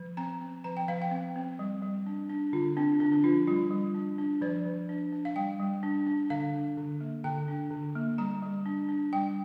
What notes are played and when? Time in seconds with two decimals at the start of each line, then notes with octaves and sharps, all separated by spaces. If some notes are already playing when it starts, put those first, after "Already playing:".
Already playing: F3
0.17 C4 A#5
0.41 C4
0.64 F3 A#5
0.77 G5
0.88 F3 F5
1.02 G5
1.11 C4
1.36 C4
1.59 G3
1.82 G3
2.06 D4
2.30 D4
2.53 D3 F4
2.77 C4 D4
3.00 D3 D4
3.12 D4
3.24 F3 F4
3.47 G3 F4
3.71 G3
3.94 D4
4.18 D4
4.41 F3 D5
4.66 F3
4.89 D4
5.12 D4
5.25 F5
5.36 G3 G5
5.60 G3
5.83 D4
6.06 D4
6.30 D3 F5
6.54 D4
6.77 D3
7.01 A#3
7.24 D3 G5
7.48 D4
7.71 D3
7.95 A#3
8.18 G3 A#5
8.42 G3
8.66 D4
8.89 D4
9.13 G3 G5